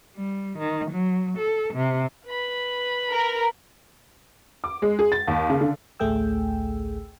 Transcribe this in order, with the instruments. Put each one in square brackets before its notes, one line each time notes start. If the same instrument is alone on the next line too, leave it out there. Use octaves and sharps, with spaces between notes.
[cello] G3
D#3
F#3
A4
C3
[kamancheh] B4 B5
[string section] A#4
[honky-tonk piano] D6
G#3
G#4
A6
D#2
C#3
D3
[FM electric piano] A1 D2 A3 G#4 G5 E6